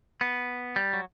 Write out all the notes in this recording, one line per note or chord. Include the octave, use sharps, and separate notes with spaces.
B3
G3
F#3